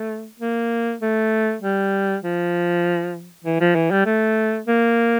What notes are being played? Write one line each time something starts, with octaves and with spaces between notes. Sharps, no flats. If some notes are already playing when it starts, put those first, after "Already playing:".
Already playing: A3
A#3
A3
G3
F3
E3
F3
E3
G3
A3
A#3